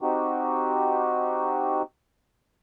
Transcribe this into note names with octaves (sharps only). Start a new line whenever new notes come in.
C4 D#4 F#4 G4